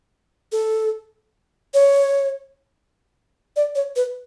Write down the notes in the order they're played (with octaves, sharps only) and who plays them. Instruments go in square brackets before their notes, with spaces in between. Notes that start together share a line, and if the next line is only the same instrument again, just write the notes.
[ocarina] A4
C#5
D5
C#5
B4